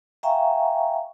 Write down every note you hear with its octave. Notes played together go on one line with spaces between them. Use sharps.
E5 F5 G5 G#5 A#5 C#6